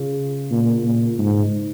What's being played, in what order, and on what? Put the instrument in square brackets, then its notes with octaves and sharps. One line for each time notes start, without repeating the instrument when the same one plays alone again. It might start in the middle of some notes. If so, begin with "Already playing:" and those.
Already playing: [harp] C#3 G#3 F4
[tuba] A#2
A#2
G#2